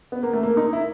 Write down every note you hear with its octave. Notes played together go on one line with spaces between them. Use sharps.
B3
A#3
A3
A#3
D#4
E4